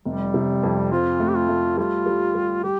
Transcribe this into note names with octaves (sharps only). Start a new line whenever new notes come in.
F1 G3
C3
F2
C4 F4
A3
G4
F4
A3
G3 F4
G3
G3
G3 G4